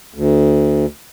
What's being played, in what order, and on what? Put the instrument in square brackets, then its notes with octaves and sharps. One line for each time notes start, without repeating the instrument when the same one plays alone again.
[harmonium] D2